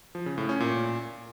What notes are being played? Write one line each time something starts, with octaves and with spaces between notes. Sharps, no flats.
F3
C#3
A2
C#4
A#2